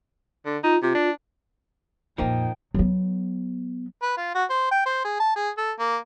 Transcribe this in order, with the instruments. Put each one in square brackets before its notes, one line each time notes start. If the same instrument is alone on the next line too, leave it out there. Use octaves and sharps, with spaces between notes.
[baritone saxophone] D3
[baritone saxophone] D#4 [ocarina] F4
[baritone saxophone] C3 [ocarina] F4
[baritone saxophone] D4
[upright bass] F2 A#2 [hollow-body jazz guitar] F3 A#3 D#4 [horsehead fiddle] G5
[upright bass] F#3 B3
[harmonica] B4
F4
F#4
C5
G5
C5
G#4
A5
G#4
A4
A#3